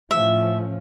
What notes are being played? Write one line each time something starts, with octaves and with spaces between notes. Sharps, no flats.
A2 F3 C#4 E5